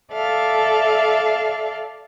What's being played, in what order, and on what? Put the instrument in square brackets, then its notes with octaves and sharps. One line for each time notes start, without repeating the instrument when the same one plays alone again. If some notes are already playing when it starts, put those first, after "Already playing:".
[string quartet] A4 D5 E5 F5